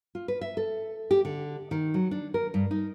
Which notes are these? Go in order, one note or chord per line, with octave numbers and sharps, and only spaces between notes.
F4
B4
E5
A4
G4
D3
D#3
F#3
D4
A#4
G2
D#4